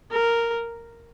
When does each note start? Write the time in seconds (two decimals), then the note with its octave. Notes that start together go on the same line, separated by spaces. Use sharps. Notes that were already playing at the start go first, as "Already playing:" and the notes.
0.11 A#4